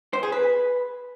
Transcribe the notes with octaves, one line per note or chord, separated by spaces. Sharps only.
C5
G#4
B4